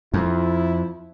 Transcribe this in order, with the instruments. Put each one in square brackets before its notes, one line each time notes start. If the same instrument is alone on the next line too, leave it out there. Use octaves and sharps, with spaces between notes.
[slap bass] F2 [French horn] E4